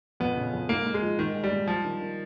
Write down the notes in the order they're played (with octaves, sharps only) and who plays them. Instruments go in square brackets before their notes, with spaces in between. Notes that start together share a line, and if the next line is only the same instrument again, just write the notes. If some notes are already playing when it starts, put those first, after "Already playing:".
[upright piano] F2 [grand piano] B3
[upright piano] C#3
F2
[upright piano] G#2 [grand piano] A#3
[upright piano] G#2
[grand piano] G#3
[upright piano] F3
[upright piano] G#2 [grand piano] D#3
[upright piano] G#3
[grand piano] G3
[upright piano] G#2
[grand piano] F3 [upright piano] G3
[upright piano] D#3
D#3